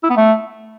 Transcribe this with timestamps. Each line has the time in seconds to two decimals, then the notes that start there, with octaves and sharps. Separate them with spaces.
0.03 E4
0.10 B3
0.16 A3